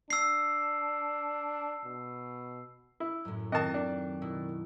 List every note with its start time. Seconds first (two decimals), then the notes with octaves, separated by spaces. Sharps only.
0.10 D4 E6 C7
1.85 B2
3.00 E4
3.25 F#2 A2
3.52 D#3 C4 A#4 D#5 A5
3.74 D4
4.21 B2 E4